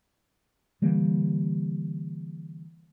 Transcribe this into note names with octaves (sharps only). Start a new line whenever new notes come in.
D3 E3 G3 A#3